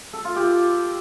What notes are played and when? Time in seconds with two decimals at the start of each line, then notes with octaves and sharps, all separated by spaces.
0.13 A4
0.25 F4
0.36 G4